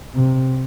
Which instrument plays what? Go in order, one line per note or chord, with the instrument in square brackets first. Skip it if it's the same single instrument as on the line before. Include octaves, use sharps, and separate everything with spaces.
[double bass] C3